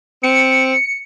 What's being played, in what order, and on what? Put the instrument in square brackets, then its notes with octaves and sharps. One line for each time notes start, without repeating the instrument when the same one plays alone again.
[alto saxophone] C4 [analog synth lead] C#7